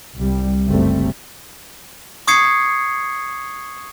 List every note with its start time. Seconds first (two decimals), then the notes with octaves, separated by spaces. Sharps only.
0.19 C2 G3
0.67 F#1 C3 G3 A3 C4
2.28 C#6 D#6 G#6 C7 C#7